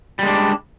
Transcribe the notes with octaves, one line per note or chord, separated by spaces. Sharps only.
G3 G#3 D4